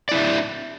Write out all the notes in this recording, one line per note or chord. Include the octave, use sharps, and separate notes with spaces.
D4 E4 D5 E5